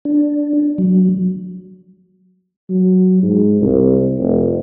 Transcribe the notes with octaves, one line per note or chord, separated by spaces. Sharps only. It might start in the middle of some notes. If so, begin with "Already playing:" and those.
D4
F#3
F#3
G#2
C2
F1